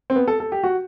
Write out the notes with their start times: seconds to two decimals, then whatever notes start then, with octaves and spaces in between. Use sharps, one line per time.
0.10 C4
0.16 B3
0.28 A4
0.40 A4
0.52 G4
0.63 F#4